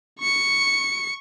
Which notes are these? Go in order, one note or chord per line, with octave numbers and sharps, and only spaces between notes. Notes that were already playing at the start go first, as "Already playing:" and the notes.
C#6 C#7